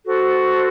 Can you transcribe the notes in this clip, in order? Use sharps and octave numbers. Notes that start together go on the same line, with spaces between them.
F#4 A4 C5